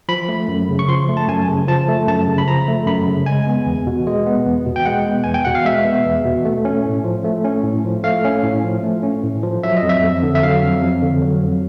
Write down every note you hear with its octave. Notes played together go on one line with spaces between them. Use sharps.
F3 B5
A3
F#2
C#3
C#6
F3 C6
A3
A5
F#2 G#5
C#3
F3 A5
A3
F#2 A5
C#3
B5
F3 A#5
A3
F#2 B5
C#3
G#3 G#5
B3
E2
B2
G#3
B3
E2
B2
G5
G#3 F#5
B3
E2 G#5
G5
B2 F#5
F5
G#3 E5
B3
E2
B2
A3
C#4
A2
F3
A3
C#4
A2
F3
A3 F5
C#4
A2
F3
A3
C#4
A2
F3
F#3 E5
D#5
F2
E5
F2
D3
E5
F#3 F5
F2
F2
D3
F#3
F2